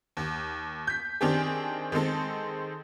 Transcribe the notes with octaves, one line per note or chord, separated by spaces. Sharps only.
D#2
G6 B6
D#3 C4 D4 G4 G#4
D#3 G#3 C4 A4